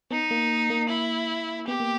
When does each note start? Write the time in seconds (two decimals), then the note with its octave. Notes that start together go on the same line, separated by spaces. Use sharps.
0.11 B3 D#4
0.31 A#3
0.70 A#3
0.89 E4
1.68 B3 G4
1.80 A#3